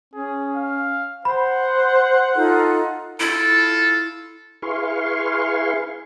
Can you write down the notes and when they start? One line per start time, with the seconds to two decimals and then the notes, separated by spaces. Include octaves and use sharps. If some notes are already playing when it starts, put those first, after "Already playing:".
0.14 C#4 G#4
0.56 F5
1.25 C5 F#5 B5
2.35 D#4 F4 A4
3.20 E4 F4 A4
4.62 E4 G#4 B4 F5 C6 C#6